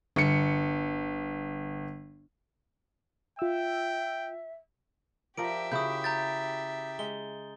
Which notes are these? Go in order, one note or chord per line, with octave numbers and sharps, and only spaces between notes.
G1 C#7
F4 E5 G5 E6
F3 G4 A#4 D5 E5 D7
C#3 E4 F#4 D#6 G6
A#5 G6 A6
G#3 G7